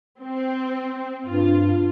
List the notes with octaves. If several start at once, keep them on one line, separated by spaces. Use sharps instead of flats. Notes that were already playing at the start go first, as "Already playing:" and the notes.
C4
G2 F4